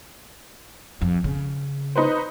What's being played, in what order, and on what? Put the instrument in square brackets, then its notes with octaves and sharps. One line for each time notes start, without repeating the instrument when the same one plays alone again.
[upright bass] F2
C#3
[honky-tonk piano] D#4 B4 C5